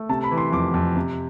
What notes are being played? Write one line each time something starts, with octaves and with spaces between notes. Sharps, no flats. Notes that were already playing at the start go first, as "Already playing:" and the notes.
Already playing: A3
C3 A5
B5
E3
C6
F2 D6
F2
C3